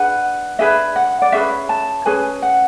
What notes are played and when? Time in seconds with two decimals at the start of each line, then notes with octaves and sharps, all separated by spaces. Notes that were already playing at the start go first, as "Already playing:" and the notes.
Already playing: D4 G#4 B4 F#5
0.59 D4 G#4 B4 E5
0.96 F#5
1.22 D5
1.32 C#4 G#4 B4 E5
1.69 A5
2.06 C#4 G#4 B4 G#5
2.42 F#5